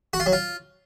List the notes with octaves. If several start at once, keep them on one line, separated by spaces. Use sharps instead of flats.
F#4
F4
F#3
F4